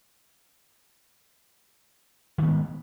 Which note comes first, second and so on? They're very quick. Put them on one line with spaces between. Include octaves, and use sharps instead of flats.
D#3 B3 G#3